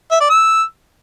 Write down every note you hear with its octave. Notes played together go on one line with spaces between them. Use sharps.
E5
D5
E6